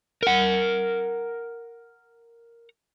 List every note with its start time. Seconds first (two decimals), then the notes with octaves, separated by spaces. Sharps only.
0.23 A#4 F#5